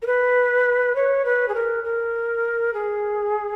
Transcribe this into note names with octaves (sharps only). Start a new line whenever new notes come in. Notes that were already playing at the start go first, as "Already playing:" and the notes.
A#4
B4
C#5
B4
G#4
A#4
A#4
G#4